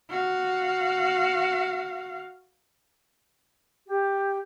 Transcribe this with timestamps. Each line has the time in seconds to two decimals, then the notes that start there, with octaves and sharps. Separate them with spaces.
0.10 F#4 F5
3.87 G4